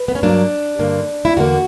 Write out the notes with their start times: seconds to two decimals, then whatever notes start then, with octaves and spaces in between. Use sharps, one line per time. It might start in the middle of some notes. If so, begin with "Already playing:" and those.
Already playing: B4
0.08 B3
0.15 C#4
0.22 G2 F#3 A#3 D4
0.79 G2 D3 A#3
1.25 E4
1.37 E2 D3 A#3 F#4